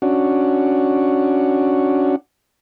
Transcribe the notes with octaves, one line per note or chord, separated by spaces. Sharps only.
C#4 D4 F#4